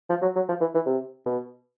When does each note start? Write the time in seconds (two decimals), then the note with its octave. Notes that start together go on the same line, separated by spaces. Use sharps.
0.10 F3
0.22 F#3
0.36 F#3
0.49 F3
0.61 E3
0.75 E3
0.86 C3
1.26 B2